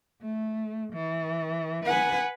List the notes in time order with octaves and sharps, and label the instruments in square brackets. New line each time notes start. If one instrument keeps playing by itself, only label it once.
[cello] A3
E3
[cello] B4 [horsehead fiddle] F#5 G#5